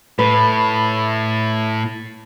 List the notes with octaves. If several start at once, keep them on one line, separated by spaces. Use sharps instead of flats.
A2 B4